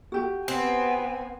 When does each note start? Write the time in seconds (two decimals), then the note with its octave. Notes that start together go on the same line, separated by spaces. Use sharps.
0.12 F#4 G4
0.48 B3 C4 G#5